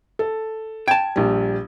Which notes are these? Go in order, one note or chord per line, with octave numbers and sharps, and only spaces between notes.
A4
G5 A5 G#6
A#1 G3